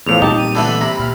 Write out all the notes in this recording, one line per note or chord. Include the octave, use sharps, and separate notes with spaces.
E2 A2 F3 F7
A#2 G3 C4 D#4 G4 A5
D#7
D3 E3 A3 B5
C3 A#5
A#2 F6